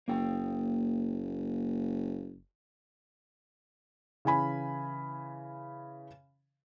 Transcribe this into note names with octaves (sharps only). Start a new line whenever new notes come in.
F#1 A#3 G5
C#3 E3 G#5 B5